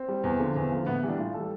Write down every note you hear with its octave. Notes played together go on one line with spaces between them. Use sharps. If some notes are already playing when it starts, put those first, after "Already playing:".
Already playing: C4
G3
E2
D3 F3
E2
D3 F3
A2 B3
E3 G3 D4
A2 F4
E3 A4
G3